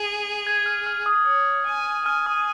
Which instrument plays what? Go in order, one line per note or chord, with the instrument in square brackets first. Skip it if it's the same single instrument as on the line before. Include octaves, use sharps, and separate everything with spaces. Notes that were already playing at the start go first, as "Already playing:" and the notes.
Already playing: [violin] G#4
[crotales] G#6
F6
F6
D#6
[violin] C#5 [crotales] D#6
[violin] G#5
[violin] G#5 [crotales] F6
[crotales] D#6